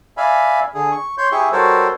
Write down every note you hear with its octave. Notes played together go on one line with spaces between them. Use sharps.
D5 E5 F5 G#5 B5
D3 G#4
C#6
C#5 C6 G6
E4 G4 G#4 E5 C#6
G3 F#4 A4 A#4 C5 C#5